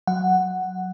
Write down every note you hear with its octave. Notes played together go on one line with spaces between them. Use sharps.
F#3 F#5